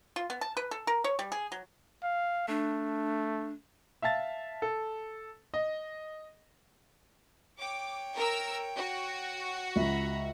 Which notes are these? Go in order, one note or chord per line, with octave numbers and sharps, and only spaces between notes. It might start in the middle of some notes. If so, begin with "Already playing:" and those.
F4
B3
A5
B4
A4
A#4
C#5
G3
G#4
F#3
F5
A3 D4
E5 F5 A5 A6
A4
D#5
C#5 G5 D6
A#4 E6
F#4
C#2 E5 A#5 B5